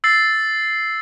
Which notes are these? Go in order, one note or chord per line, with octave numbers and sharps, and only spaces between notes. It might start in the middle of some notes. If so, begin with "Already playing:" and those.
E6 A6 C7